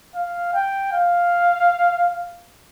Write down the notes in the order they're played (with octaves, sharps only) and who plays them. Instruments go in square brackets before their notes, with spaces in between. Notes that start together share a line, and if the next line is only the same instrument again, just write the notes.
[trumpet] F5
G5
F5